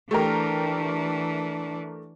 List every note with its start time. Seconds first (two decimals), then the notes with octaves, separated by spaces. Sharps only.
0.11 E3 A3 D4 G4 A#4